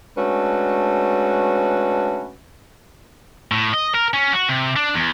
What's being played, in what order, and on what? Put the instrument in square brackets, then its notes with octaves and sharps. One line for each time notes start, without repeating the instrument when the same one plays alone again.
[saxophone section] G#3 A3 C#4 D4 F#4 B4
[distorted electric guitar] A2
D#5
A#4
C#4
F#4
C3
D4
E2